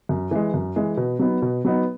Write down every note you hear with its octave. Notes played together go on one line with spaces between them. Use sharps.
F#2
E3 G#3
F#2
E3 G#3
B2
F#3 B3 D#4
B2
F#3 B3 D#4